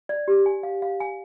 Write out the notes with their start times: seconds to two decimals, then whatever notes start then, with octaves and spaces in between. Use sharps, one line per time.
0.09 D5
0.28 G4
0.46 G#5
0.63 F5
0.82 F5
1.00 G#5